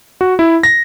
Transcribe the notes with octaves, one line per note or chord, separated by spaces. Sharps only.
F#4
E4
A#6